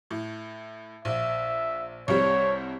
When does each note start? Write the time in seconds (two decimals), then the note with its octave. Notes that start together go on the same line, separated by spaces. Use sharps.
0.11 A2
1.05 A#1 E5
2.08 C2 C3 G3 C#5